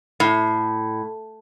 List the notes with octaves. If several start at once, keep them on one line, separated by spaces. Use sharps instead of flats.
A2